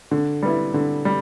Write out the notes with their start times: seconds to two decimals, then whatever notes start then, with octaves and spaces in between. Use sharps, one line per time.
0.11 D3
0.42 G3 B3 E4
0.74 D3
1.05 G3